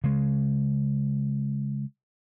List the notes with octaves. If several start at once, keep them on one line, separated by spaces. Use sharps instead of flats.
C#3 G#3